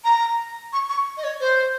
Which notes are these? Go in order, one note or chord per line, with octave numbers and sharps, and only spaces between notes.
A#5
C#6
C#6
D#5
C#5
C5